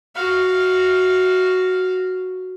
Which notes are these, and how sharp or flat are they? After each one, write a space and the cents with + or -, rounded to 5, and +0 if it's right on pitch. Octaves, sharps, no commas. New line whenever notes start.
F#4 +0 F5 +0